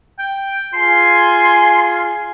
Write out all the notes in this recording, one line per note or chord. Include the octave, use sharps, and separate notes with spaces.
G5
F4 G#4 G#5 C6